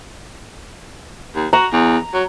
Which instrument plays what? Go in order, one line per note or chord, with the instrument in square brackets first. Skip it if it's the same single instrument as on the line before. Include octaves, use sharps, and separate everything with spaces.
[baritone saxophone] D#2
[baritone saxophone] F#4 [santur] A#5
[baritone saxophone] E2
F#3